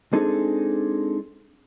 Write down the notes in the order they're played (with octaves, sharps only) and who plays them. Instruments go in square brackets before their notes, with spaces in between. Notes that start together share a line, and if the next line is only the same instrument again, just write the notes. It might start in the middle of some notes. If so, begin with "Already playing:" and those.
[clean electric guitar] G#3 C4 D4 D#4 G#4 A4